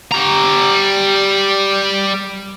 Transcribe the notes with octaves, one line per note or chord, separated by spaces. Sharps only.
G3 A#5